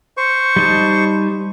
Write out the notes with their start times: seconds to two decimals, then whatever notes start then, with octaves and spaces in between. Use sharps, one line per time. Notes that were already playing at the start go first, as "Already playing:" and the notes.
0.17 C5 C#6
0.56 G3 D#4 A5